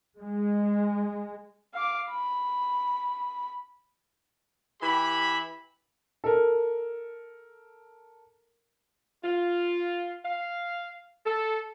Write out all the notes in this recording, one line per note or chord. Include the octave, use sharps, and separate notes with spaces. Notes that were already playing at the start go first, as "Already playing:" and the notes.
G#3
F5 D6
B5
E3 G4 E5 B5
A4 A#4
F4
F5
A4